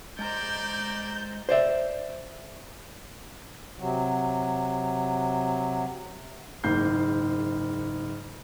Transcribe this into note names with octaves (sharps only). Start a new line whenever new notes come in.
G#3 C5 D5 G5 A#5 G6
C5 D5 E5
C3 F#3
F#1 G#2 D#3 A#3 G6 C7